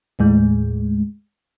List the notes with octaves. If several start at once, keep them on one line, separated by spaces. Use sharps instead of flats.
D#2 A2 G#3